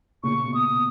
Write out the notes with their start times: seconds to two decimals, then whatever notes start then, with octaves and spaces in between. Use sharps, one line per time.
0.23 A#2 C#3 C#6
0.44 B2
0.54 D#6
0.65 B2